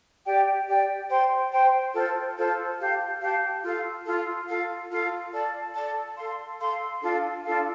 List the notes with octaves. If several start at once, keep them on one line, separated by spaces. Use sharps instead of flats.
G4 D5 G5
G4 D5 G5
C5 G5 C6
C5 G5 C6
F4 A4 C5
F4 A4 C5
G4 F5 A5
G4 F5 A5
F4 A4 F5
F4 A4 F5
F4 A4 F5
F4 A4 F5
A4 D5 A5
A4 D5 A5
A4 F5 C6
A4 F5 C6
D4 F4 A4 F5
D4 F4 A4 F5